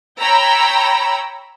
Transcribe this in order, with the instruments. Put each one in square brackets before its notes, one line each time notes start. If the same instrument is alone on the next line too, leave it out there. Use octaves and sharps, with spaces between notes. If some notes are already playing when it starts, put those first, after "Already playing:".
[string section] C#5 G5 A#5 B5 E6